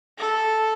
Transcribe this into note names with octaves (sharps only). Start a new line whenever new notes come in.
A4